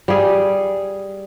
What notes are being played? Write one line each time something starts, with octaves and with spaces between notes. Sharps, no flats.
G3 G#4